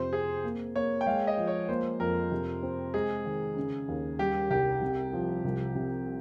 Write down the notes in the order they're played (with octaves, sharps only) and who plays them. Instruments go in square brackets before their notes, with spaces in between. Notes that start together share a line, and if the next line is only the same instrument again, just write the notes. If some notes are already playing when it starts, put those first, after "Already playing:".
Already playing: [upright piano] F2 C3 [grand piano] C5
[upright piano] C4 [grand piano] G#4
[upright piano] A#3
[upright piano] A#3 [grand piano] C#5
[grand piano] G5
[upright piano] G#3 [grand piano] F5
[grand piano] D#5
[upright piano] F3
[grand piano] C#5
[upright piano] A#3 [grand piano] C5
[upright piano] F2 [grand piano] A#4
[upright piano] C3
C4
[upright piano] G#3 [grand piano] G#4
[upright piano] D#3
C#3
D#2
[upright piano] G3 [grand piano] G4
[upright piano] C2 [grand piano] G4
[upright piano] C3
F3
C2
C3